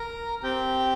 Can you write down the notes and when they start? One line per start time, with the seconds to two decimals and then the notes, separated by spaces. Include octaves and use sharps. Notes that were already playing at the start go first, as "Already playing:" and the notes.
Already playing: A#4 A#5
0.43 C4 G4 G5